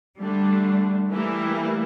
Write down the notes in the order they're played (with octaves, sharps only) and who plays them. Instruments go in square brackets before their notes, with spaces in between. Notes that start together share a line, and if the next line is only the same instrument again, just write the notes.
[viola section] D3 A3 D4 [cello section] G3
[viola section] E3 G3 A#3 E4 [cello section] A3